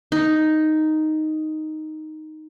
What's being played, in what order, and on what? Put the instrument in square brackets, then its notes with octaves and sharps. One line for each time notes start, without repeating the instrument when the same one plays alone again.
[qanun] D#4